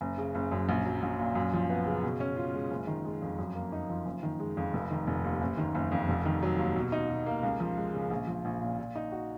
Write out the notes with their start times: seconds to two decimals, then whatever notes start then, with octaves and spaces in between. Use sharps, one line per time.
0.01 F#1
0.18 C#3
0.35 F#1
0.52 F#2
0.69 A#1
0.85 F#3
1.03 A#1
1.19 A#2
1.35 F#2
1.53 F3
1.70 B3
1.86 C#3
2.04 B2
2.20 C#4
2.37 F4
2.54 G#3
2.71 F#1
2.87 D#3
3.05 G#3
3.22 F2
3.38 F#2
3.55 A#3
3.72 D#4
3.89 F3
4.06 F#1
4.23 D#3
4.40 G#3
4.57 F2
4.73 F1
4.91 D#3
5.07 F1
5.24 D#2
5.41 F#1
5.58 D#3
5.75 F#1
5.92 F2
6.08 F1
6.25 D#3
6.43 F#3
6.58 D#2
6.76 B2
6.92 D#4
7.10 B2
7.26 A#3
7.43 C#2
7.60 F3
7.77 G#3
7.94 C#3
8.10 A#1
8.27 F3
8.45 A#1
8.62 A#2
8.78 A#2
8.96 D#4
9.12 F#4